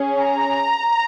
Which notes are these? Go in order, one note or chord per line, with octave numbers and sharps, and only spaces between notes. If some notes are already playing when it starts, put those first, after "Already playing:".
Already playing: C#4 G#4
A#5